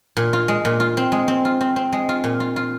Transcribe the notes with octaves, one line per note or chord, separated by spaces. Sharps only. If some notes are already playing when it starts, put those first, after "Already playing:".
A#2
F4
G#3
A#2
F4
C4
G#3
C4
F4
C4
C4
G#3
F4
A#2
F4
F4